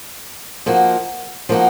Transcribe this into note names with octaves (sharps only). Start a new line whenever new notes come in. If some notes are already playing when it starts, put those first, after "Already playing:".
F3 A#3 D#4 F#4
F3 A#3 D#4 F#4